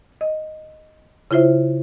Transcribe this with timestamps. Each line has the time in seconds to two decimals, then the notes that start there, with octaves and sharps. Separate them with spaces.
0.21 D#5
1.31 C#3 E4 F4 C5 E5